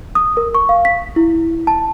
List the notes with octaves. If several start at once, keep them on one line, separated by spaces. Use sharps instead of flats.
D#6
A#4
C#6
F5
B6
E4
A5